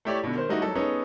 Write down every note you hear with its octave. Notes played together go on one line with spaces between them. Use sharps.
A3 E4 G4 C#5 D5
B2 D3
D#3 C5
G3 A3 D#4 E4 F#4
F#3 A4
B3 C#4 D#4 G#4 A4 C#5